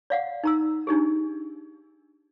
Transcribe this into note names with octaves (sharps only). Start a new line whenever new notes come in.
D5 F5 F#5
D#4 A#5 E6
D4 D#4 G4 G#4